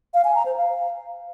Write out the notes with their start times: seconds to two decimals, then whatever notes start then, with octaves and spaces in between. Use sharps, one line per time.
0.14 F5
0.24 G#5
0.35 A#5
0.45 C5
0.56 F5